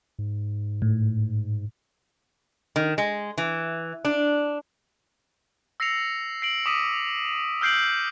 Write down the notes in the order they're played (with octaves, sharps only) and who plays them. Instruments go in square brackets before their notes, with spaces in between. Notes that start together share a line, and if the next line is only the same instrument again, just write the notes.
[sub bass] G#2
[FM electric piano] A2
[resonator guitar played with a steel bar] D#3
G#3
E3
D4
[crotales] E6 A#6 C7 C#7 F7
C7 D7 F#7
D6 D#6 B6 D7 D#7
E6 F6 G6 C7 D7 F#7